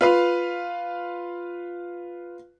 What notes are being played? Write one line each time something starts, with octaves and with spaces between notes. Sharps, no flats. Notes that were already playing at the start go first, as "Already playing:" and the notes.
F4 B4 F5